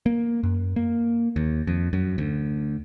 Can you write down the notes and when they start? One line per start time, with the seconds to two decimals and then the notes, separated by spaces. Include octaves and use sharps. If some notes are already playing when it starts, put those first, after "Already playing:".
0.06 A#3
0.43 F#2
0.76 A#3
1.36 D#2
1.67 F2
1.93 F#2
2.18 D2